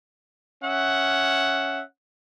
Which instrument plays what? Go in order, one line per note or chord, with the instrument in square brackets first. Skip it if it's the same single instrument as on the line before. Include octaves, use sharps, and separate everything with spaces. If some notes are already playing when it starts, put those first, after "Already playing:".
[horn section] C#4 E5 F#5